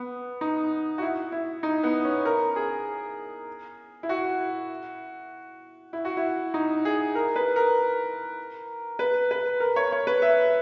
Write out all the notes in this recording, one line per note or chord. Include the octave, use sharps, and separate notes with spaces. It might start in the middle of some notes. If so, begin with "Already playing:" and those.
Already playing: B3
D#4
F#4
E4
E4
D#4
B3
C#4
A#4
G#4
E4
F#4
E4
F#4
E4
D#4
G#4
A#4
B4
A#4
B4
B4
A#4
C#5
C#5
B4
E5